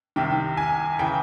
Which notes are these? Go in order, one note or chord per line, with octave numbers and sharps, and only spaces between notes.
C2 C3 D#3 G5
G#5
C#3 E3 G5